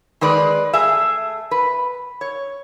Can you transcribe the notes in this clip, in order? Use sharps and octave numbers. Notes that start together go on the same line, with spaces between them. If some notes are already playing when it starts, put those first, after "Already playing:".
D#3 G#3 B4 D5
A3 G#4 E5
B4
C#5